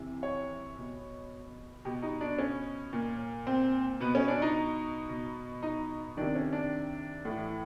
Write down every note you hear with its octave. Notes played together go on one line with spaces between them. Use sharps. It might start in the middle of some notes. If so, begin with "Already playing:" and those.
Already playing: C3 E3
C#5
B2
B2 G4
D#4
D4
C#4
A#2
C4
B2 B3
C#4
D4
D#4
B2
D#4
C3 D#3 D4
C#4
D4
A2 E3